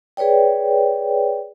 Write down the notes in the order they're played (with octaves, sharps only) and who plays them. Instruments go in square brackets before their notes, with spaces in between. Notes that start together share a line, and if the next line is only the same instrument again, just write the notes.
[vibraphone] G#4 B4 C#5 D5 G5